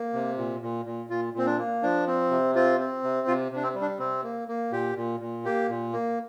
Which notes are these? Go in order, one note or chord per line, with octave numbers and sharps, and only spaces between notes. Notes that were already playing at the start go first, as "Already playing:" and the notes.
Already playing: A#3
C3
A#2
A#2
A#2
A#2 F4
A#2 C4
D4
A#3
F3 D4
C4
C3
C4 F4
C4
C3
C3 F4
C3 D4
C4
G3
D4
C3 C4
A#3
A#3
A#2 G4
A#2
A#2
A#3 G4
A#2
A#3